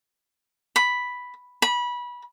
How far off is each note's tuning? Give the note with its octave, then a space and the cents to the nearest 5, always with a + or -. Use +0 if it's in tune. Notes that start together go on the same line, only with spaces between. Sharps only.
B5 +0
B5 -25